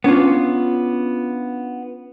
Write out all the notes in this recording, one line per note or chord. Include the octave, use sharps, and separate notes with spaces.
B3 C#4 D4 F4